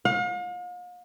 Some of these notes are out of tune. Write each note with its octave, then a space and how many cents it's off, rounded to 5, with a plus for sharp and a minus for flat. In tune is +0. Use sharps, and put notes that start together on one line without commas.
F5 +45